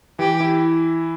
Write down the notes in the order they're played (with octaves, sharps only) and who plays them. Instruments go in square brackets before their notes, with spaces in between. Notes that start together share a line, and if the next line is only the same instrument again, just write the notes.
[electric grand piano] E3 [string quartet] G4
[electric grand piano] E4